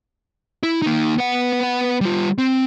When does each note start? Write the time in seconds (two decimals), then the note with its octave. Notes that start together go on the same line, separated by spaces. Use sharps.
0.63 E4
0.82 A#3 D#4
1.18 B3 F#5
2.01 G3 F4
2.38 C4